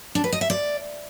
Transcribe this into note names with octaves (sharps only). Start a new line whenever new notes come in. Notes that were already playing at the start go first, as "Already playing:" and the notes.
D4
B4
D#5
E5
D5